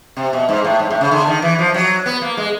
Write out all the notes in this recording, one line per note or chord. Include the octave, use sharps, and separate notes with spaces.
C3
B2
G#2
A2
G#2
A2
C#3
D3
D#3
E3
F3
F#3
B3
A#3
G#3